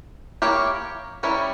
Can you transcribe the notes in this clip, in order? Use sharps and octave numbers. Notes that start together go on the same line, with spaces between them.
A#3 E4 G4 A#4 C#5
G3 C#4 E4 A#4 C#5